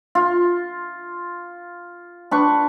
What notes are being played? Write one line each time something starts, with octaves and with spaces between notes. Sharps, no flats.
F4
D4 B4 C#6